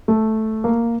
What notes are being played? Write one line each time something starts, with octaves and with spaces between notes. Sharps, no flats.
A3
A#3